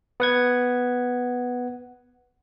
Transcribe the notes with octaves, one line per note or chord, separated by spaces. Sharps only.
B3 F#5 G#6